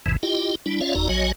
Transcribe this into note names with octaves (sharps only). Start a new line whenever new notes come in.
A1 E2 G#2 C3 E3
E4 F4 G4 D#5 G5
G3 D4 E4
C#4 F4 C#5 D5 E5 F5
F#1 E2 D#4 F#4 D5 A#5
A#1 F#3 F#4 C#5 D#5 G#5